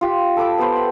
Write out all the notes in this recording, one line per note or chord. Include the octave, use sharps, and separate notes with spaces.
F4 G4
A4 B5 D6 E6
B3 G4 B4 C5
B5